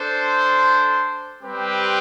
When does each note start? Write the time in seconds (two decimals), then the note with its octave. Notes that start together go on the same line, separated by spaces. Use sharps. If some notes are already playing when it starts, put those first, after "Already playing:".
Already playing: D4 A4 C5
1.42 G3 C4 G4 B4